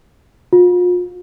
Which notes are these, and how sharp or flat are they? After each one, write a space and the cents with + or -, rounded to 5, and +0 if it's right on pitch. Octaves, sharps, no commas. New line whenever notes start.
F4 +40